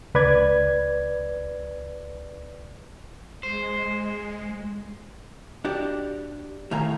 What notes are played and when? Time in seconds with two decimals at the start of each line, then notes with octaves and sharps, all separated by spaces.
0.14 C#2 B4 D5 G#6
3.43 G#3 C5
5.65 D4 F#4 G4 D5
6.71 A2 D#3 F5 G#5 A#5